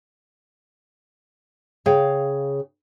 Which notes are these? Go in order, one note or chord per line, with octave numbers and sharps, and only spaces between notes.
C#3 G#4 C#5 F5 G5